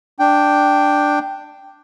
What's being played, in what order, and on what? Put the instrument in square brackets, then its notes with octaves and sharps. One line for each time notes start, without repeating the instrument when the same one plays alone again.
[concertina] D4 G5